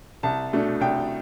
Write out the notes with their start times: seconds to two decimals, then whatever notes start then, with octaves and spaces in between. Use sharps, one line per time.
0.23 C2 A5
0.53 B2 A3 D4
0.81 C2 G5